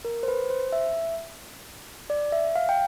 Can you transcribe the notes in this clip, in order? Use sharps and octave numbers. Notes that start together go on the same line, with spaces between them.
A#4
C5
B4
C5
E5
D5
E5
F5
G5